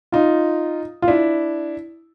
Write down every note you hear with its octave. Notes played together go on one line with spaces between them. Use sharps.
D#4 F4
F4
D4 E4